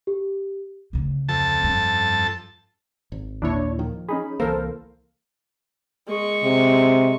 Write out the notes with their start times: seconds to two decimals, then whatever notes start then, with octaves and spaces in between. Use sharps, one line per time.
0.07 G4
0.93 D2 C#3
1.29 F2 A4 A5
1.64 G2 C#4
3.12 G#1
3.42 D#2 A#2 D4 E4 C#5
3.79 D#3 F3
4.09 C#4 D#4 G#4 B5
4.40 C2 E3 A#3 A4 A#4 C5 F5
6.07 G#3 C#6
6.43 C3